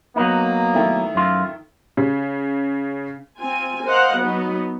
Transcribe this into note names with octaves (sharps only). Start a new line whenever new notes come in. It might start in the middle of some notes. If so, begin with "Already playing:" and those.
F#3 A#3 B3 D#4
D#3 A3 E4
F#2 F4
C#3
C4 F4 G#5
A#4 C5 D#5 F5 F#5
F#3 B3 D#4 F#4